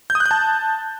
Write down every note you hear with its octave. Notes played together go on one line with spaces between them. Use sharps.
G6
D#6
F#6
G6
A5